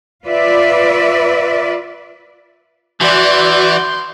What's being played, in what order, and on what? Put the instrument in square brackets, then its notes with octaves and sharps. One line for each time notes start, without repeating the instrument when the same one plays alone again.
[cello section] F4 B4 D5 E5
[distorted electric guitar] E3 [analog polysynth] F#4 D5 [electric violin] C6 G6